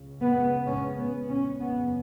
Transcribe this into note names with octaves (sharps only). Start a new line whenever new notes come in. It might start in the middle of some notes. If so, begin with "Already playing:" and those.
Already playing: C#2 C#3
B3
C#4
B3
C#4
F#1 E2 C#3 B3